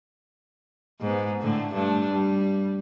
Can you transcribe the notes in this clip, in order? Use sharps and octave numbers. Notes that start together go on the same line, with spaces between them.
G#2 B3
A2 D3 A3
G2 A3 D4
G3